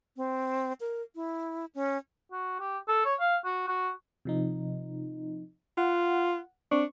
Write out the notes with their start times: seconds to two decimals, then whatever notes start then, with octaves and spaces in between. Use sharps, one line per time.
0.17 C4
0.81 A#4
1.15 E4
1.75 C#4
2.32 F#4
2.60 G4
2.88 A4
3.05 C#5
3.20 F5
3.45 F#4
3.68 F#4
4.25 C3 F3 D#4
5.77 F4 F#5
6.72 C4 D4 C#6